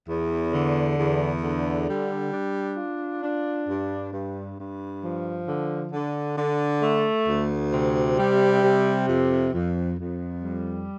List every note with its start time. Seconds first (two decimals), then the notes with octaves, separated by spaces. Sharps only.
0.07 E2
0.52 D3
0.97 E2
1.42 D3
1.87 G3
2.32 D4
2.77 F4
3.23 D4
3.67 G2
4.12 G2
4.58 G2
5.02 F3
5.47 D3
5.92 D3
6.37 D3
6.82 A3
7.27 D2
7.72 C3
8.18 G3
8.62 C3
9.07 F2
9.53 F2
9.98 F2
10.43 G3